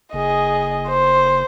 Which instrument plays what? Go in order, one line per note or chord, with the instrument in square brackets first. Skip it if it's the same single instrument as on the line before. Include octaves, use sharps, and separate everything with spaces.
[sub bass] F#1 [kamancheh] G#4 D#5
[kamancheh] C5